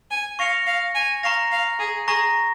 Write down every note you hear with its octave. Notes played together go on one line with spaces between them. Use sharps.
G#5
F5 C#6 A#6 C#7 F7
F5
G#5
F5 A#5 C#6 A#6
F5
G#4
G#4 A#5 C#6 A#6